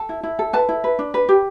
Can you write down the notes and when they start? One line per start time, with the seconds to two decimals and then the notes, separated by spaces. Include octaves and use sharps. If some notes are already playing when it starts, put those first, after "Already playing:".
Already playing: A4 A5
0.09 E4
0.23 E4
0.39 A4
0.53 B4 A5
0.69 E4
0.84 B4
0.99 D4
1.14 B4
1.29 G4